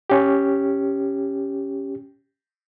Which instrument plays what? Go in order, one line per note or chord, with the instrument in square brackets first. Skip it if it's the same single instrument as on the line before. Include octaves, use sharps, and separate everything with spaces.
[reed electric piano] C#4 G4